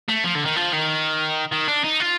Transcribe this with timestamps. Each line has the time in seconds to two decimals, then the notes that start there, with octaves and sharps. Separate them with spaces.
0.09 A3
0.25 F3
0.36 D3
0.46 D#3
0.57 F3
0.73 D#3
1.52 D#3
1.68 D4
1.84 D#4
2.00 F4